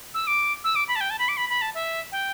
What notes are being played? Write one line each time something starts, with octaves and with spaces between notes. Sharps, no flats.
E6
D6
E6
D6
B5
A5
G5
A5
B5
D6
B5
B5
A5
E5
G5